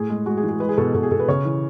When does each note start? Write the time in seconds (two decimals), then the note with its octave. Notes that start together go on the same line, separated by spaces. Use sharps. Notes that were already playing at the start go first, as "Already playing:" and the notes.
Already playing: A2 G#4
0.09 G#3
0.26 G#3 F#4
0.37 G#4
0.43 E3
0.49 G#4
0.60 G#3 B4
0.69 G#4
0.77 B2 A4
0.94 B2 A4
1.03 G#4
1.11 B2 A4
1.20 B4
1.28 C#3 C#5
1.45 E3